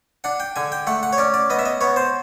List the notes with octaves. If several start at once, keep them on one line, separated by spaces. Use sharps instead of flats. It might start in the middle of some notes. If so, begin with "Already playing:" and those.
D4 F#5
G5
D3 G#5
G5
A3 F#5
F#5
C#5
C#4 D5
D5
B3 D#5
E5
D#5
B3 C#5
C5